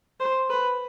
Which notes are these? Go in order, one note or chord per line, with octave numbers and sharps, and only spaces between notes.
C5
B4